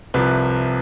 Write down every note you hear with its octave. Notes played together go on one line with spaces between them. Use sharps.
C2 C3 F3 B4